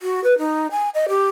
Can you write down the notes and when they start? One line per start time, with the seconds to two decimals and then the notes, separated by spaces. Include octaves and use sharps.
0.02 F#4
0.24 B4
0.38 D#4
0.71 G#5
0.95 D#5
1.09 G4